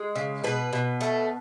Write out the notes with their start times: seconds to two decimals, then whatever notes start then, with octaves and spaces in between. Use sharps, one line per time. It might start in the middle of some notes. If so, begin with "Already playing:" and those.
Already playing: G#3
0.16 C#3
0.44 B2 B4
0.73 B2
1.01 A3